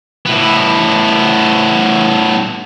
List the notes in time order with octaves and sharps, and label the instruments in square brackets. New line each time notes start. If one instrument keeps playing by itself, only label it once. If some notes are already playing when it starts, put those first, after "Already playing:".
[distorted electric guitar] A2 B3